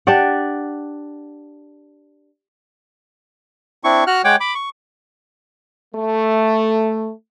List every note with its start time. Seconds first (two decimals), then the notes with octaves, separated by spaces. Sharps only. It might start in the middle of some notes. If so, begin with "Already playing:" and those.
0.07 D4 G4 D5 F#5
3.84 C4 D4 E4 C#6
4.07 F#4 F#5 F6 F#6
4.24 G#3 C#5 F#5 G5 D6
4.40 B5 D6
4.55 C#6
5.94 A3